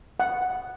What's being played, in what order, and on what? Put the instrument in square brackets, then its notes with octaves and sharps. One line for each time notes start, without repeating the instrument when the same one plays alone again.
[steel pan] F#5